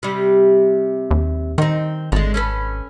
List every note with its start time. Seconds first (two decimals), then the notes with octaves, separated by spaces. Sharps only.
0.03 C3 G3
1.11 D#2
1.58 D#3 C4 D#4
2.12 G#1 D3 G#3
2.34 C#4 A4 B4